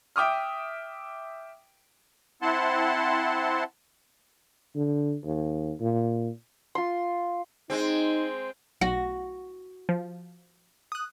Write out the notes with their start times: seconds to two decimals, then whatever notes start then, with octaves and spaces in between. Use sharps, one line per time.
0.16 E5 G5 D6 D#6 F6
2.42 C4 E4 F#5 A5 C6
4.75 D3
5.25 D#2
5.81 A#2
6.75 F4 C6
7.70 G#3 C4 D#4
8.81 B1 F#4 A#6
9.89 F3
10.92 D#6 F#6